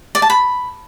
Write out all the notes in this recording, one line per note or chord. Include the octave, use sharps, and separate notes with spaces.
D5
A5
B5